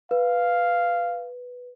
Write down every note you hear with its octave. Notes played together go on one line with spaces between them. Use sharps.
B4 F5